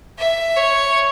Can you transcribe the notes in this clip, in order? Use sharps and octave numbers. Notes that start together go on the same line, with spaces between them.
E5
C#5